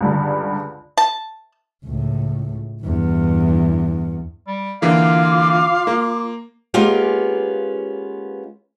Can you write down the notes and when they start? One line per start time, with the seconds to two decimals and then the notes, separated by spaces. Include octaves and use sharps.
0.01 C#2 G2 D3
0.97 A5
1.85 C#2 A2
2.82 E2 G2
4.48 G3
4.82 D3 E3 A#3 F4 F5 C6 D6
5.87 A#3
6.74 G#3 A#3 B3 C#4 F4 G4